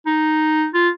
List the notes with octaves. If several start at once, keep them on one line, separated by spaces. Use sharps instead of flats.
D#4
F4